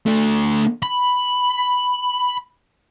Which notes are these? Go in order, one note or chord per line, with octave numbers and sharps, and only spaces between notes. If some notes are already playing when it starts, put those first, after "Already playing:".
A3 D4
B5